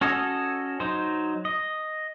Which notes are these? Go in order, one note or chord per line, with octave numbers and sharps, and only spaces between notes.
C#4 F#4 A4 C#5 D#5
F#3 D#4 C5
D#5